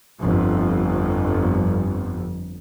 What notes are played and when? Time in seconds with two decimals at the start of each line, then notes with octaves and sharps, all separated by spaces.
0.19 G1 F2